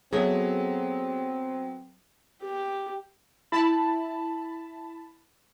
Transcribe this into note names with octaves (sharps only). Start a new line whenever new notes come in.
F#3 B3 C4 F#4 G#4 A4 C#5 E5
G4
E4 A5 B5